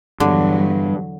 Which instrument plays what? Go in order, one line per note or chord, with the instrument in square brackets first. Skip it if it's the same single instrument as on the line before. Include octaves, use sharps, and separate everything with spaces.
[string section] E2 F#3 [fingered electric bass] G2 [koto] D3